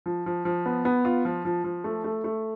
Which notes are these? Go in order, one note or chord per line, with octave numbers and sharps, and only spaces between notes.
F3
F3
F3
B3
B3
F4
F3
F3
F3
A3
A3
A3